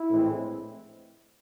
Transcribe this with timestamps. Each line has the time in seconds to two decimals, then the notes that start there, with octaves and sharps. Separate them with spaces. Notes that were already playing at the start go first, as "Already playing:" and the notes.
Already playing: E4
0.09 A#1 A2 E3 G#3 C4